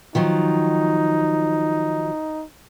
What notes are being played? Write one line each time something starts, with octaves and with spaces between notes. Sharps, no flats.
D#3 F3 F#3 D#4